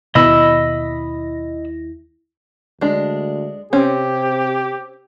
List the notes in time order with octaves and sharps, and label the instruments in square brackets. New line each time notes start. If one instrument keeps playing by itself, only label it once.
[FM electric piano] D#2 E4 A#6 [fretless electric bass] B2 B3 [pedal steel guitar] D#5 B5 E6
[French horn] D2 [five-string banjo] G#3 D4
[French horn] C3 [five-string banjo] C4 C#4 [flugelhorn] G4